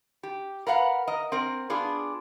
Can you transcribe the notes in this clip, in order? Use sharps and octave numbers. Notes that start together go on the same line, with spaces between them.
G4
A#4 B4 F5 F#5
A#4 D#5
C4 A#4
B3 D4 F4 G#4